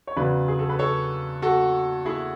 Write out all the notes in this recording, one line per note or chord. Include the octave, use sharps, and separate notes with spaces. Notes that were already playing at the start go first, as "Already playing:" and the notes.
C#5
E2 C#3 F#3 B4 D5
G#4
A4
B4
A4 C#5
F#4 A4
E4 G#4